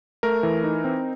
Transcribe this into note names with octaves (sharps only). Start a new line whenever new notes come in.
A3 A#4
E3
D#4
C4